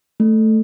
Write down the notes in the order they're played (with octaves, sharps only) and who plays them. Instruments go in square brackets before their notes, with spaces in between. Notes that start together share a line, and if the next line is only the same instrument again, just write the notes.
[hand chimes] A3